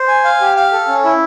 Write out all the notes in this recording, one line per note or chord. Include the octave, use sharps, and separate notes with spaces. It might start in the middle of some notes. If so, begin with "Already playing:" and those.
Already playing: C5
G#5
F5
G4
F5
A4
C#4
E4